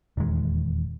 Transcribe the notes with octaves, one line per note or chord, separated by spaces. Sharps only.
D#1 E2 D#3 G#3